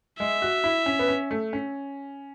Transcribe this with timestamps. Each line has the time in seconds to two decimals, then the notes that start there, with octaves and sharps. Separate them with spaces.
0.19 G#3 E5
0.42 F#4
0.64 E4
0.86 C#4
0.99 B3
1.08 C#4
1.31 A3
1.53 C#4